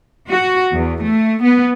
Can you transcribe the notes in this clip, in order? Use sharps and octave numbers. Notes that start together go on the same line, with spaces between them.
F#4
E2
A3
B3